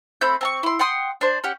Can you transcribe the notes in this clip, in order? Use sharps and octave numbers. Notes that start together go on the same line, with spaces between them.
A3 C4 B5 G6
C4 A5 C#6
E4 C6
F#5 G5 C6 D#6
D4 C5
C#4 G4 F#5